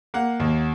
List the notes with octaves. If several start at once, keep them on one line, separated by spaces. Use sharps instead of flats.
A#3 F#5
D#2